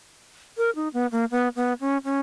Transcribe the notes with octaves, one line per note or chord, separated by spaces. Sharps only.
A#4
D#4
B3
A#3
B3
B3
C#4
C#4